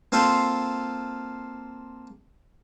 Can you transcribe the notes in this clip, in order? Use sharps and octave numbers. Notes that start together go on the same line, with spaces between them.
A#3 C4 F4 A4 C5